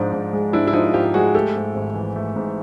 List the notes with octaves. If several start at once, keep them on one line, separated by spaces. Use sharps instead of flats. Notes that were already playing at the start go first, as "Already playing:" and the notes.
Already playing: G#2 F3 D4
G#2
G#3
G#2 D4 E4
E4
F3 D#4 F4
G#2 F4 G4
G#3 F#4 G#4
A3 G4 A4
G#2
G#1
E3
A3
G#2